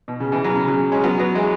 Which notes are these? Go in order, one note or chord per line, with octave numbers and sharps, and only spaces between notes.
B2
C#3
B2 E3
C#3 F#3
C#3
C#3 F#3
G#3 C#4
F#3 B3
F#3 B3
E3 G#3